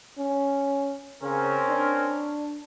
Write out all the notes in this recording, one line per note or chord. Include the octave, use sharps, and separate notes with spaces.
C#4
C#3 C4 C#4 A#4
D4